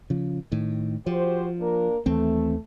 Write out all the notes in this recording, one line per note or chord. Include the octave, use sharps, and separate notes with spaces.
C#3 F3
A2 D#3
F3 F#4 G4 C5
A#3 D4 A#4
D#2 E3 A3 C4